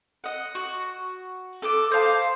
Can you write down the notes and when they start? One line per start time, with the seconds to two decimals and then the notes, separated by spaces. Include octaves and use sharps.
0.24 D#5 F#5
0.55 F#4
1.62 A4 B4 D5 D6
1.92 C5 D#5 F5 A5